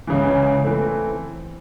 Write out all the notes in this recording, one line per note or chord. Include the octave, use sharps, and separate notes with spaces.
C#2 C#3 E3
E3 A3 C4